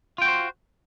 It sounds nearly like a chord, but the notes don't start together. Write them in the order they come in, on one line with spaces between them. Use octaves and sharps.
F4 G5 F#4 C5